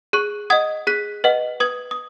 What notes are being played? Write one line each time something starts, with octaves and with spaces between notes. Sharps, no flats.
G#4 C#6 F#6
D#5 F#5 D#6 G#6
G#4 F#6 B6
B4 D#5 F#5
B4 D#6 G#6
D#6